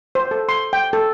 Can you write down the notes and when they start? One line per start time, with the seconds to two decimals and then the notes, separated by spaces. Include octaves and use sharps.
0.15 C5
0.31 A4
0.49 C6
0.73 G5
0.93 A4